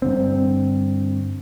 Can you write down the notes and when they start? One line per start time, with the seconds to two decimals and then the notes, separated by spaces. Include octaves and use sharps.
0.02 G2 D3 C4